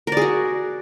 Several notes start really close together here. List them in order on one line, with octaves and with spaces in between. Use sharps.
A#4 D5 G#4 F#4